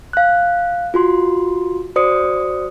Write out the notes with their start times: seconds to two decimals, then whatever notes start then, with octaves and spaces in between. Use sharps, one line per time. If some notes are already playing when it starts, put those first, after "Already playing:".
0.13 F5 F#6
0.94 F4 F#4 C6
1.96 F#4 C5 D5 D#6 C#7